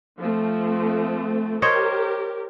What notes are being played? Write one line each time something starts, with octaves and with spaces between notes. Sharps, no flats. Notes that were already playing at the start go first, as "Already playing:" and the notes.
F3 A3 C4
G4 A#4 C5 C#5 D#5